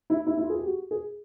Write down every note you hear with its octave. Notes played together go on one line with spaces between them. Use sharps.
E4
E4
E4
F4
G#4
G4
F#4
G#4